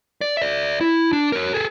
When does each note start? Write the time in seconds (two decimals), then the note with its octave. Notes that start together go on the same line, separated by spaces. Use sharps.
0.21 D5
0.37 D5 E5
0.81 E4
1.13 D4
1.32 A#4 C#5
1.54 G#4 A4